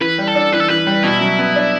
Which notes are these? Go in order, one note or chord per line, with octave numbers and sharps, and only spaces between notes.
E3 B4
G3
A4
D4
E3 B4
A4
E3 B4
G3
B2 E4
F#3
B3
D4